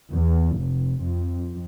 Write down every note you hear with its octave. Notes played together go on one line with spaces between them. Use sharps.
E2
F1
F2